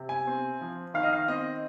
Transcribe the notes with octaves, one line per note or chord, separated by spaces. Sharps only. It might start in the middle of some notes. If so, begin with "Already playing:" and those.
Already playing: C3
G#5
C4
F3
D#3 F5
D#5
F5
C4 D#5